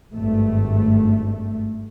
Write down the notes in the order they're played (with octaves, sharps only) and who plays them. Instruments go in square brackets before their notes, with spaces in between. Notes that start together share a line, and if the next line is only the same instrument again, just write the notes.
[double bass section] G#1 G2 A3